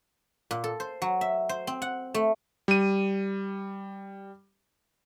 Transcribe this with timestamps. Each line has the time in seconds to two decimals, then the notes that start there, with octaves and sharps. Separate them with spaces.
0.51 A#2
0.64 A4
0.80 C5
1.02 F#3
1.21 E5
1.49 C5
1.67 C4
1.82 F#5
2.14 A3
2.68 G3 D#7